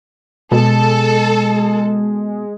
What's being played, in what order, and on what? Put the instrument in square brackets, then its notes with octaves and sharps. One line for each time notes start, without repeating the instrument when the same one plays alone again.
[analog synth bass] B2 [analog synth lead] G#3 [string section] A4